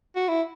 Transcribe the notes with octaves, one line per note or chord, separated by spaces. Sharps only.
F#4
E4